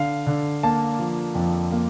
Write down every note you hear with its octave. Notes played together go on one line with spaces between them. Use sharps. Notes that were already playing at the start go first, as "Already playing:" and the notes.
Already playing: D3 F5
D3
A#3 A5
F3
F2
A#3